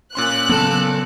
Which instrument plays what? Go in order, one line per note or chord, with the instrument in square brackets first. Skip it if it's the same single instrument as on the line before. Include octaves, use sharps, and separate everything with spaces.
[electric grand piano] A#2 C#4 C6 [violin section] F#6
[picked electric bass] C#3 F#3 B3 [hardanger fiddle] A4